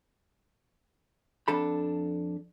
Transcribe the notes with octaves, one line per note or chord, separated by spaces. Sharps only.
F2 D4 A4 B5